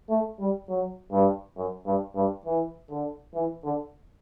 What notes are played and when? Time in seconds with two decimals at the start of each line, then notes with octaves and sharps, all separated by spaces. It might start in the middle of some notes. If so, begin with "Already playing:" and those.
0.10 A3
0.40 G3
0.69 F#3
1.12 G2
1.57 F#2
1.86 G2
2.15 G2
2.45 E3
2.90 D3
3.34 E3
3.64 D3